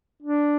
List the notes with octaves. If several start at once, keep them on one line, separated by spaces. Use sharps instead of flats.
D4